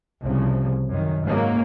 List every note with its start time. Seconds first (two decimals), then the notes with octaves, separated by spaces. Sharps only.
0.22 C2 C#3 F3
0.89 F#2 D#3
1.23 G#2 C#3 F#3 A#3